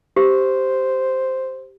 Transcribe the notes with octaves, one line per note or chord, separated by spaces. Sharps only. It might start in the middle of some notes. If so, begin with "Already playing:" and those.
G4 C5